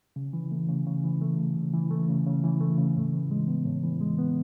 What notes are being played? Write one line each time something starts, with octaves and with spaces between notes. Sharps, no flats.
C#3
E3
A3
C#3
C#3
E3
A3
C#3
C#3
E3
A3
C#3
C#3
E3
A3
C#3
A2
E3
G#3
B3
A2
E3
G#3
B3